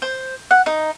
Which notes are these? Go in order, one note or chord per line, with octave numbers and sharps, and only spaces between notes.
C5
F#5
D#4